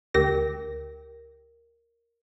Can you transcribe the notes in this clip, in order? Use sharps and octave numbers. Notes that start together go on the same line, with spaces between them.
D2 G4 A#4 A#6